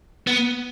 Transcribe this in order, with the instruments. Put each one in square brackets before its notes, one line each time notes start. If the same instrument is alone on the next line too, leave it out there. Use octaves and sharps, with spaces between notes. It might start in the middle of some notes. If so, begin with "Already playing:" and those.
[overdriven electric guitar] B3